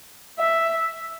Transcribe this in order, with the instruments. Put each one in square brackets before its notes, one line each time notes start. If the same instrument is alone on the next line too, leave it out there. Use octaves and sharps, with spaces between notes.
[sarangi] E5